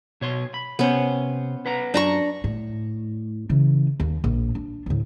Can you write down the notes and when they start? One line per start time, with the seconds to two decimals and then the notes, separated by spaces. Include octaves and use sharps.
0.21 B2 C#5 C6
0.54 B5
0.79 C3 B3 C#4 C5
1.66 B4 F#5 A#5
1.94 F#2 D4 A#5 C#6
2.44 A2
3.49 C#3 E3
4.00 D#2
4.24 A#1
4.55 D4
4.86 D2 A2